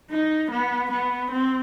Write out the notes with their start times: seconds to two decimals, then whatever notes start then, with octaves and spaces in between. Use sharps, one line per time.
0.10 D#4
0.51 B3
0.91 B3
1.32 C4